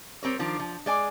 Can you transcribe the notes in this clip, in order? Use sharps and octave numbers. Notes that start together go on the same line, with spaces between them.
G3 C4 A#4 C#5
D#3 F3 D4
F3
G#3 D5 G#5